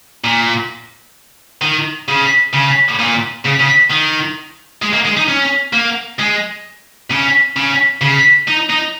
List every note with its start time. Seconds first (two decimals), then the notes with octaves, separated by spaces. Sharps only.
0.24 A#2
1.62 D#3
2.08 C#3
2.53 C#3
2.99 A#2
3.46 C#3
3.60 C#3
3.91 D#3
4.82 G#3
4.93 A#3
5.05 G#3
5.17 D#4
5.28 C#4
5.73 A#3
6.19 G#3
7.11 C#3
7.57 C#3
8.01 C#3
8.48 D#4
8.70 D#4